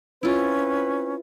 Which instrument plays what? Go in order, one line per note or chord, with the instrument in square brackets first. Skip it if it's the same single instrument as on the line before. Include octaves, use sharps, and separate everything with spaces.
[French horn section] C4 B4 [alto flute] C#4 [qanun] E4 F4